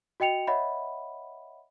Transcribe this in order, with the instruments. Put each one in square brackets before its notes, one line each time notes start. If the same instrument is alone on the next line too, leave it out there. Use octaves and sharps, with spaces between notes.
[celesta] F#4 D#5 G5 C#7 F7
C#5 D#5 E5 F#5 B5